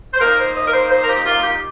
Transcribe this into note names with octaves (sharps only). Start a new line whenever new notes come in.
C5
A#2 A#3 D#4 A#4
C5
D#5
A#4
C5
C5
A#4
G4
F4
G4